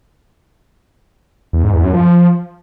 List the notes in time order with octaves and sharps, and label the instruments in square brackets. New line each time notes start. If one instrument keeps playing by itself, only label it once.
[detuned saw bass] E2
G#2
E2
F#2
F3